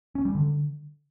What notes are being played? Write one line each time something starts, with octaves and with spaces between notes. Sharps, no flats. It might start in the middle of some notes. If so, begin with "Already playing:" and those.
C#4
G3
D3